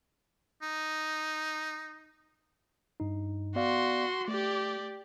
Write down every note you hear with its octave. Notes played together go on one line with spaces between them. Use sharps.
D#4
G2 D#4
B3 F#4 D5 F5 C6
A3 G4 D5